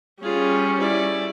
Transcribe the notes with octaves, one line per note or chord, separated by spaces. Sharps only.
G3 C#4 F4 G#4
E4 D5